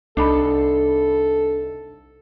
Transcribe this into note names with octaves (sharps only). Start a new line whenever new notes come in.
C2 D4 D#4 A4 B5